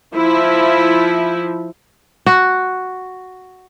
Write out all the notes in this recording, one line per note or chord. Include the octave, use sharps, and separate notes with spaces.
F3 E4
F#4